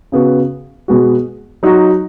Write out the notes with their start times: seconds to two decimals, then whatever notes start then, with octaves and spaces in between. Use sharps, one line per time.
0.12 C#3 B3 F#4
0.88 B2 G#3 B3 F#4
1.63 F#3 D#4 F#4